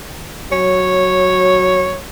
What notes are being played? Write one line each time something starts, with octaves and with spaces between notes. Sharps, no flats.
F#3 C#5